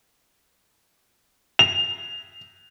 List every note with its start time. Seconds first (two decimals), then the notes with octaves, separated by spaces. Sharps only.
1.59 F7